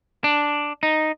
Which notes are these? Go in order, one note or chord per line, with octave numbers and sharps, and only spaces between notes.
D4
D#4